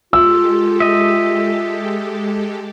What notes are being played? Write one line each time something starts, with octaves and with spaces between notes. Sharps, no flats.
G#3 F4 G4 A4 E6
D#5 E5